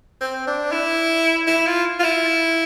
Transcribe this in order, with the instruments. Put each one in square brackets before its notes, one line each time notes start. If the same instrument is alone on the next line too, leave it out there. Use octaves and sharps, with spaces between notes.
[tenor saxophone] C4
D4
E4
E4
F4
F4
E4